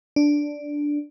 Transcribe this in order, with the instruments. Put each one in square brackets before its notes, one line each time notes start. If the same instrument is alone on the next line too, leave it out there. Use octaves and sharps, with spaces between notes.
[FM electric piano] D4